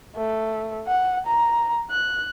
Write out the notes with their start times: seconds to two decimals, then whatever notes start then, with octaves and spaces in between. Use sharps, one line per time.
0.16 A3
0.87 F#5
1.26 A#5
1.90 F#6